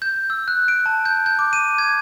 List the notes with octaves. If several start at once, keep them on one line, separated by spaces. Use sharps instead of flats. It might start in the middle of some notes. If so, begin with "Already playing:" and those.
G6
E6
F#6
D7
A5
G6
G6
D6
D#7
G#6